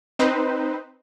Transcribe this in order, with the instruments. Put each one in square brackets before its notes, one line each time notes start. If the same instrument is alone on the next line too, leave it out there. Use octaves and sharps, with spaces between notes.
[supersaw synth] C4 D#4 B4 C5